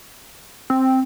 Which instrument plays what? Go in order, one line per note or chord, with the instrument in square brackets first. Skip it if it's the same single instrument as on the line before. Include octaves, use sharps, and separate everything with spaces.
[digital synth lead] C4